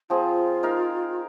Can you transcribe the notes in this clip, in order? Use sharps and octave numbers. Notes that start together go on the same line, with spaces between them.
F3 C4 F4 G#4
D#4 A#4 F5